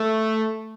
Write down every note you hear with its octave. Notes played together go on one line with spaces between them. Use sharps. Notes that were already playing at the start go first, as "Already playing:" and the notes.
Already playing: A3